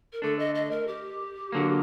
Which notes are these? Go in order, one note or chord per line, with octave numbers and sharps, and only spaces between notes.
A#4
D3 A3 D4 A4
D#5
D#5
A#4
G4
D3 F#3 A#3